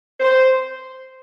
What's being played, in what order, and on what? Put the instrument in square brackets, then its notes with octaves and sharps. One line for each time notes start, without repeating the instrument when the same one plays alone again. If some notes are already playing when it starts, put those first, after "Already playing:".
[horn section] C5